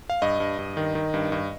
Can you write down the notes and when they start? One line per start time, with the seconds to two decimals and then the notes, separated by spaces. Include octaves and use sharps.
0.10 F5
0.22 G2 D#5
0.40 G2
0.59 G2
0.77 D#3
0.95 D#3
1.14 G2
1.32 G2